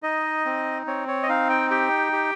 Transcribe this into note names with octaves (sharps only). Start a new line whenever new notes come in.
D#4 D#5
C4
C4 C#5
C#5
D#5
D#4 F5
G5
G4 G5
G4